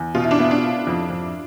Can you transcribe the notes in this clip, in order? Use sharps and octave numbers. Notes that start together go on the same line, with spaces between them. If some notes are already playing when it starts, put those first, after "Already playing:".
Already playing: E2
B2 F4
E4
D4
B3 E4
D4
F4
F2
F2